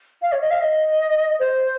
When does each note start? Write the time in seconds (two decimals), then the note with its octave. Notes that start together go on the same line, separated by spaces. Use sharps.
0.22 F5
0.32 C#5
0.40 D#5
0.50 F5
0.60 D#5
1.39 C5